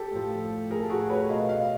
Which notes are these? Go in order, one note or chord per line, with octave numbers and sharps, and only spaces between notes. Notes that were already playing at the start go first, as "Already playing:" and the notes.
Already playing: G4 A4
A2 F3
A2 F3 G#4 A#4
A4
F#4 G#4
B4 C#5
B2 D#5 F5
D#5 F5